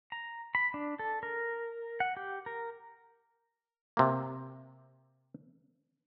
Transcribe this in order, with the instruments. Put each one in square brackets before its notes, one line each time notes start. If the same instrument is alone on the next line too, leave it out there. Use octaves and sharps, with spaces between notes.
[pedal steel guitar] A#5
B5
D4
A4
A#4
F#5
G4
A#4
[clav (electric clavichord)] C3 A#3